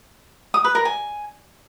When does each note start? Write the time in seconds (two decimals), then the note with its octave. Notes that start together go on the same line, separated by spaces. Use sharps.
0.54 D#6
0.64 B4
0.75 A#4
0.85 G#5